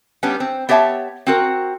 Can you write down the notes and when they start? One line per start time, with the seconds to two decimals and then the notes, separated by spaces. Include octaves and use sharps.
0.23 G3 B3 C#4 D4
0.40 C4
0.69 B3 G4 C#5 E5 A5
1.27 C4 F#4 A#4